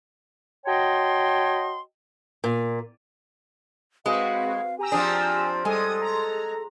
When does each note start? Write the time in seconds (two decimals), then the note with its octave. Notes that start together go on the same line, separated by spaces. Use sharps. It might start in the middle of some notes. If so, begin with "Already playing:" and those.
0.66 F#4 C#5 D#5 G5 A5 C6
2.44 A#2
4.06 G#3 C4 F#4 B4 F5
4.79 G4 G#5 A#5 E6
4.92 F3 C4 D4 G#4
5.65 G3 G#3 A4 G#5 D#6
6.01 A#5